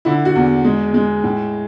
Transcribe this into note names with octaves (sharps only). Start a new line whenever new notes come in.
D3 E4
F#4
E2
G#3
G#3
A2